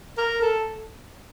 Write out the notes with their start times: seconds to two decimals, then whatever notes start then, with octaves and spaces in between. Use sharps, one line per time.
0.18 A#4
0.41 A4